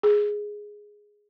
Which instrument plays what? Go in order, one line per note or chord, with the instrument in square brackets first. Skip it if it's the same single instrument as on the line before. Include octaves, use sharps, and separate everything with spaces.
[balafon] G#4